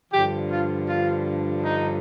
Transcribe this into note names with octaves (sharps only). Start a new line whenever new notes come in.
G2 D3 F3 G4
F4
F4
D#4